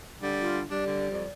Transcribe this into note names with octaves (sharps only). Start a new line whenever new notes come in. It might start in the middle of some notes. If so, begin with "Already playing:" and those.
D3 G3
F4
G3 D4 D5
D3
F2